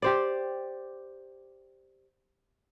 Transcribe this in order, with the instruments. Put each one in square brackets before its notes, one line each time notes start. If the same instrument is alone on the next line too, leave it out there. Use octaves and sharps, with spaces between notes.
[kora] G4 C5 D5